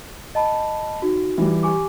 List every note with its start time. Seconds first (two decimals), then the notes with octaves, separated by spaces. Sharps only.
0.35 D#5 A5 B5
1.02 D#4 F#4
1.38 E3 G3
1.63 G4 G#5 D6